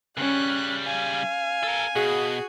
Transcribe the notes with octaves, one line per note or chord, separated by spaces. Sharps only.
C#3 G3 C#4 F#6
F5 G#5
A4 A#4
B2 F#4 G#4